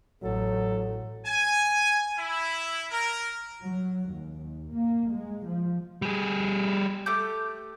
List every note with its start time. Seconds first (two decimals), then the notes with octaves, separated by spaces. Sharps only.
0.23 A1 F#3 A4
1.26 G#5
2.17 E4
2.90 A#4
3.63 F#3
4.11 D#2
4.74 A#3
5.11 G#3
5.46 F3
6.02 G3 G#4
7.06 A3 G4 D6 G6